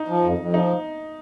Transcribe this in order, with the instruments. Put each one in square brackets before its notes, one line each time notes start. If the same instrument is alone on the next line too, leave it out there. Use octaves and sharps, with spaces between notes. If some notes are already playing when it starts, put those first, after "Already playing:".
Already playing: [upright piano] D#4
[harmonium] F3
F2
F2
[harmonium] F3 [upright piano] D#4